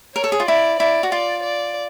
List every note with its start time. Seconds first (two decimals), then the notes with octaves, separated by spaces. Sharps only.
0.16 A#4 C#5
0.24 A4
0.32 G#4
0.40 F4
0.48 E4 D5
0.80 E4 D5
1.03 F#4
1.12 F4 D5
1.44 D5